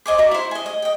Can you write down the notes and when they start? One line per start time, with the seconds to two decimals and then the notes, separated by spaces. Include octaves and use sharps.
0.06 C5 D#5 G#5 D6
0.18 F#4 A#4 D5 E5
0.31 E4 C5
0.51 D#5 G#5
0.66 D#5
0.82 D#5 G5